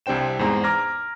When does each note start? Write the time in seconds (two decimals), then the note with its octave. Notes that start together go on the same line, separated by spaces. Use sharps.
0.06 C2 C3 D4 C5 G5 E7
0.39 E2 G#2 C5 A#5
0.64 A#5 D6 F6 G#6 A#6